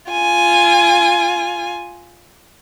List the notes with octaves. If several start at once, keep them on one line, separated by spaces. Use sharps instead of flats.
F4 G#5